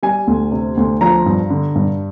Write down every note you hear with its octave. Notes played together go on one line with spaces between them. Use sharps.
G3 G#5
D2
C3
D2
F3 A#5
G2
D3
G2